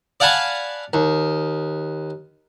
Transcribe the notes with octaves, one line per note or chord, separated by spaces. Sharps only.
D5 F5 F#5 G#5 A5 B5
D#2